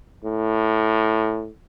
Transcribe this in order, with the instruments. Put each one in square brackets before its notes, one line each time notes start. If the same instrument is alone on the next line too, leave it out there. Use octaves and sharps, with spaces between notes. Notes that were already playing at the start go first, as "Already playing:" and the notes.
[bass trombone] A2